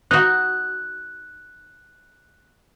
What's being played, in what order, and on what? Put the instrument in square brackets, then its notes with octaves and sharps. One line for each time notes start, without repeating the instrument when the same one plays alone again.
[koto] D#4 F#4 [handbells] F#6